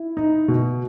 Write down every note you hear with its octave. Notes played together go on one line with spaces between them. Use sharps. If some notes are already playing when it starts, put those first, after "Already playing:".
Already playing: E4
D#4
B2